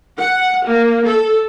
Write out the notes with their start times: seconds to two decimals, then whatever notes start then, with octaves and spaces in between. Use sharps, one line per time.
0.18 F#5
0.64 A#3
1.04 A4